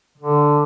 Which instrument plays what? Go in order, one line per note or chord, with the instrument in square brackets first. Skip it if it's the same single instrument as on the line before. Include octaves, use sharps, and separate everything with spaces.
[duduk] D3